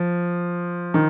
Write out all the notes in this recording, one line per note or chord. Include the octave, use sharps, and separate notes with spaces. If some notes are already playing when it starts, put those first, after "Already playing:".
Already playing: F3
D#3